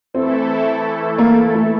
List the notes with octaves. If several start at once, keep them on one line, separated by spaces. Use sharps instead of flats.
E3 A3 C4 E4 A4
A#3
A3